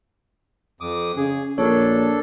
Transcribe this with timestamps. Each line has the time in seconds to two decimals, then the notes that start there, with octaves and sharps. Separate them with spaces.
0.81 F2 D6 D#6
1.17 C#3 G#4
1.58 A#1 D4 A4 A#4 C#5